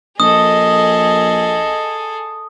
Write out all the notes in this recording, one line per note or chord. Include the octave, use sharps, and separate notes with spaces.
A#1 G#4 A4 D#5 D#6